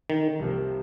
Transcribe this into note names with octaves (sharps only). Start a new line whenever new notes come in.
D#3
C2 C3 F3 A#3